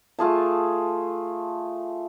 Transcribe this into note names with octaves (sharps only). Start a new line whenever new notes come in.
A3 F4 G#4 A5